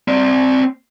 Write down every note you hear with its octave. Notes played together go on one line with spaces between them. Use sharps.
C4 D5